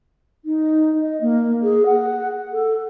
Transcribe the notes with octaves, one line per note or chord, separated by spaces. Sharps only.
D#4
D#5
A#3
G#4
F#5
A4